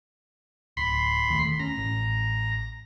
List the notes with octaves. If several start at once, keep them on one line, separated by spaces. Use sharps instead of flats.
D1 B5 C6
E1 D#3 A3
C#4 A#5
A1